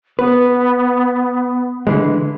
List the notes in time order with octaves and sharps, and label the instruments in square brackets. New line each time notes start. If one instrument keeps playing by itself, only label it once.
[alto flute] B3 [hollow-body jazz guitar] B4
[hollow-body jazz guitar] D3 E3 G#3